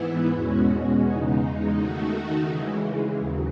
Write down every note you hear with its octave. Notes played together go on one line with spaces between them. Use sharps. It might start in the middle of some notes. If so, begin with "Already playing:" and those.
Already playing: G#2 E3 B3 E4
E2 B2 G#3 C#4 F#4
E2 C#3 G#3 D#4
D#3 A3 D#4 F#4
C#3 E3 G#3
D#2 C#3 F#3